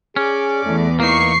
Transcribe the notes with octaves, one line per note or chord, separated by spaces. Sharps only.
C#4 G#4 D5
E2 A3
E3 A3 A#3 D#4 C#6 C7